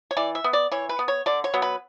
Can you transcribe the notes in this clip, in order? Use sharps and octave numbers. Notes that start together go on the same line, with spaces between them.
C#5
E3 D5
E5
B3
D5
E3 C#5
B4
B3
C#5
D3 D5
C#5
F#3 B3
B4